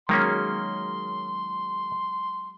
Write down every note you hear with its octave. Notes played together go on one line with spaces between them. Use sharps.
D#3 F#3 G#3 A#3 C#4 F5 C6